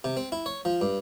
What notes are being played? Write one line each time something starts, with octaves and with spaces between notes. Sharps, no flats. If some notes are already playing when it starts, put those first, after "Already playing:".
C3
C4
E4
C#5
F3
G2